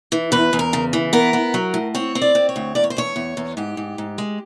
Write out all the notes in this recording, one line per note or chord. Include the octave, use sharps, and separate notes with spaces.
E3
E2 B4
E2
A#4
C#3
E3
B3 A#4
B3
F#3
A2
C4 C#5
C4
D5
C4
C#5
D2
E2 D5
C#5
C5
E2 C#5
E2
E2
G#2 G4
G#2
G#2
G#3